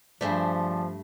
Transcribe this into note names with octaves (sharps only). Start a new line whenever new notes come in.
G2 F3 A3 G#4 C5 D5